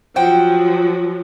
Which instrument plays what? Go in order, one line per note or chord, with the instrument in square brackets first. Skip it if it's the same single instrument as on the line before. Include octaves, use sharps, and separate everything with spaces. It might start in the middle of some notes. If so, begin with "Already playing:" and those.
[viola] F3 F#3 [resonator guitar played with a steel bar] C5 F#5 G5